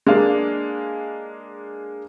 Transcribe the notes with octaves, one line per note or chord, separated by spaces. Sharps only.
G#3 A#3 D4 A#4 F5